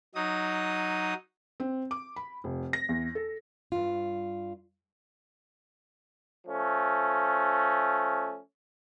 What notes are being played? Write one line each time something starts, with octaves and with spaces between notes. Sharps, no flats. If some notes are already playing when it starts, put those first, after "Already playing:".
F#3 D#4 D#6
C4
D6
B5
F1
A#6
E2
A4
G2 F4
F3 A3 C#4